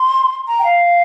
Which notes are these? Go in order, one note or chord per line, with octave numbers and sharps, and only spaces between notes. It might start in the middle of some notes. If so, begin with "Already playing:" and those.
Already playing: C6
A#5
G5
F5